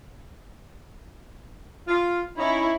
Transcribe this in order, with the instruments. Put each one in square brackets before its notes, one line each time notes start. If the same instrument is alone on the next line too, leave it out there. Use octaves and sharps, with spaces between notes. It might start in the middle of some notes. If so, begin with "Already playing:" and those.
[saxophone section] F4
[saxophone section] C#4 D#4 C#5 [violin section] E4